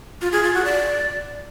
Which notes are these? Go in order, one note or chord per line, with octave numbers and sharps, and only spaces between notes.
F4
G#4
F4
F#4
D5